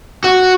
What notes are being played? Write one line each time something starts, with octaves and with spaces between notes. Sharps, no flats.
F#4